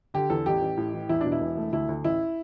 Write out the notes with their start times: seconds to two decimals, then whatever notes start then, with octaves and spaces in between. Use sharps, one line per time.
0.14 D3 G4
0.30 E2 A4
0.46 A1 G4
0.62 A1
0.77 A2
0.93 E3
1.09 E2 E4
1.21 B2 D4
1.32 E4
1.41 E1
1.57 A3
1.73 D2 E4
1.89 D2
2.04 A1 E4